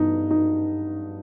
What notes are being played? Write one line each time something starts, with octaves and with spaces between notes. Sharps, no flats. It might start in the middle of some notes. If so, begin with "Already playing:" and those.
Already playing: G2 E3 B3 D#4
D#4